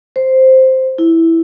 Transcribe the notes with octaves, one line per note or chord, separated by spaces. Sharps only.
C5
E4